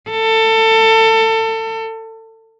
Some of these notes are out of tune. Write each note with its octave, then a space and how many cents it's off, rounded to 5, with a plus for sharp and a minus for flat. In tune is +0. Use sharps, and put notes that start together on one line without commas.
A4 +25